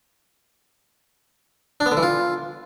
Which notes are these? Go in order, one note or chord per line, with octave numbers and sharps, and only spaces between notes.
D4
B3
D3
E3
F4